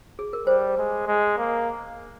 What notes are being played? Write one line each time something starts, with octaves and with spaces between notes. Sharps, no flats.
G#4
A#4
G3 C5
G#3
G#3
A#3